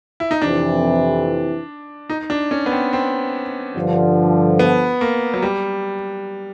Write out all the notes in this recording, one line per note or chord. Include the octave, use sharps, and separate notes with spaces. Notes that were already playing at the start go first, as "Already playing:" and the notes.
E4
D#4
F2 C3 E3 D4
D#4
D4
C#4
B3
C4
C4
G2 D3 F3
B3
A#3
F#3
G3